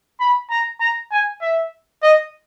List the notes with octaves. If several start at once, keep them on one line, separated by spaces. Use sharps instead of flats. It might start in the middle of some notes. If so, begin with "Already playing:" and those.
B5
A#5
A#5
G#5
E5
D#5